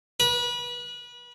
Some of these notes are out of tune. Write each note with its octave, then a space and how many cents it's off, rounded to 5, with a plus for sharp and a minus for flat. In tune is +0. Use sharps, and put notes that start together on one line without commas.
B4 -30